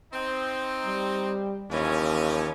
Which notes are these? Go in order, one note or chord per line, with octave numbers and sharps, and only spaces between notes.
C4 D#4
G3
D#2 E3 F3 C#4